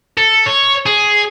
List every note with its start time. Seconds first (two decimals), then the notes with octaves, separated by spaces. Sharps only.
0.18 A4
0.46 C#5
0.86 G#4